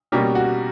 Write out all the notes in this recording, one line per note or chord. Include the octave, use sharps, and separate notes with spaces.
B2 G3 A#3 C#4 G4
F#4